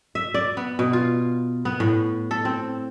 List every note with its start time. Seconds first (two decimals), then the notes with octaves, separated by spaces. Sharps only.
0.15 E5
0.34 D5
0.57 B3
0.79 B2
0.93 F4
1.65 B3
1.80 A2
2.31 A4
2.45 C4